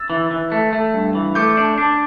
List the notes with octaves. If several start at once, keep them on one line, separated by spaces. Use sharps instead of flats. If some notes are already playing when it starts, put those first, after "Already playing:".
Already playing: E6 A6
E3
E3
A3
A3
G2
E3
A3 D6 G6
D4
D4